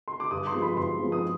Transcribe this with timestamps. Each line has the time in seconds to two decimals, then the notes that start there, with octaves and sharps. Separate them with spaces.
0.08 C6
0.20 D6
0.31 G2 D#6
0.47 C6
0.54 F3 G#3 B3
0.62 B5
0.77 G2 C6
0.99 F3 G#3 B3
1.12 D#6